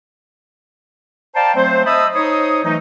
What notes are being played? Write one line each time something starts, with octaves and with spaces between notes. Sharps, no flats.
C5 D5 F5 G5 A5 A#5
F#3 A3 C4 C5
D#5 E5 A5 B5 D#6 E6
D#4 C5 C#5 D#5 D#6
E3 F#3 A3 D#4